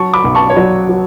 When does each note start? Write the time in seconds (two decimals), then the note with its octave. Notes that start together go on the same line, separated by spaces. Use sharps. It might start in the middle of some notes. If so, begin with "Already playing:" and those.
Already playing: F#3 A5 C#6
0.13 B5 D6
0.24 B1
0.35 A5 C#6
0.50 C#5
0.56 F#3 D5
0.89 F#3